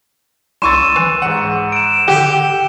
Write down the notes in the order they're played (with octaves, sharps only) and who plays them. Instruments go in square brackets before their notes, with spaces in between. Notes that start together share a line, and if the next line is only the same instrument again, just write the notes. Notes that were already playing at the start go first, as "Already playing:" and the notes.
[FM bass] C2 [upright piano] C6 C#6 A6 [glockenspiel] E6 D#7 E7
[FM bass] E3
[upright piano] G#2 F#5
[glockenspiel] D7 E7
[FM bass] D3 [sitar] G4 [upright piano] F#5